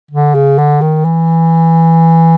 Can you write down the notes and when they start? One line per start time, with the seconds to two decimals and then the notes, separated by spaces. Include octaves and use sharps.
0.11 D3
0.34 C#3
0.58 D3
0.81 D#3
1.05 E3